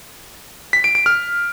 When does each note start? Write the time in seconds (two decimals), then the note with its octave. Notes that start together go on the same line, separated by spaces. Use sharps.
0.73 B6
0.84 D7
0.95 D7
1.06 F6